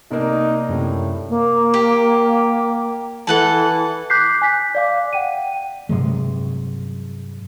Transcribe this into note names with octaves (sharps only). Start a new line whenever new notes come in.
C2 A#3 D#4 D5 C6
F#2 A2 C3
A#3
G4
E3 A4 F#5 A5
D6 F#6 G6 B6 C7
G#5 F#6 B6
D5 F5 D6
F#5 G5 D#7
G2 C3 F#3 G#3